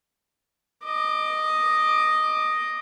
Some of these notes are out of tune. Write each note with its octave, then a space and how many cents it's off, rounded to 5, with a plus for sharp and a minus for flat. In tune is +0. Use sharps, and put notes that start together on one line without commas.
D#5 +0 D6 +20